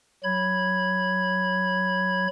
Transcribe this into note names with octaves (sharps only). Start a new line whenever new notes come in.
F#3 B5 G#6